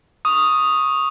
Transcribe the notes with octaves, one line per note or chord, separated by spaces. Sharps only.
C#6 D#6